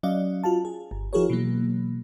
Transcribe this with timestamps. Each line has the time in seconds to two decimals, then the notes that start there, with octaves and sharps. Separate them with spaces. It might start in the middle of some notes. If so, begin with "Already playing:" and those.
0.03 F#3 C#4 D5 D#5 F5
0.44 F4 F#4 F5 A5
0.65 G#4
0.91 G1
1.13 F3 E4 F#4 G#4 A#4 C#5
1.30 B2 E3 F#3 A#3